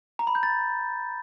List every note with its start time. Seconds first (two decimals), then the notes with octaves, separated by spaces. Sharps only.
0.19 A#5
0.27 B5
0.35 G6
0.43 A6